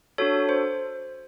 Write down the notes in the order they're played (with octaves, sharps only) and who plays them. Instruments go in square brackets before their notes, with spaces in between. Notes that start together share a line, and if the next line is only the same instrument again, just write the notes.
[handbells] D4 F#4 A4 C#5
C5